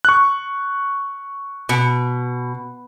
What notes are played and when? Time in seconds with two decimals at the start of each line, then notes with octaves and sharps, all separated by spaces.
0.05 C#6 F#6
1.69 B2